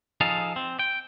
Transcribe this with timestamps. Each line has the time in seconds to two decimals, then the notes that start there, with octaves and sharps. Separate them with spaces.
0.21 F3 D#4 G#4 A4 F5
0.56 C4
0.79 G5